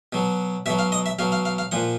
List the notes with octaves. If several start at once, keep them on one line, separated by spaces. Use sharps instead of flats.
B2 F#3
B2 F#3 E5
F5
D#5
E5
B2 F#3 F5
F5
F5
F5
A#2 F3 F#5